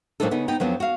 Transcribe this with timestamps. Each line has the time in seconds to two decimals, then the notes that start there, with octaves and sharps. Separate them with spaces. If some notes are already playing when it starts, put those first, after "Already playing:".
0.20 A#2 F#3 C4 D4 D#4 A4
0.31 C#3 B3 D#4
0.48 B3 D#4 G5
0.60 F2 F#3 B3 D4
0.80 F#4 F5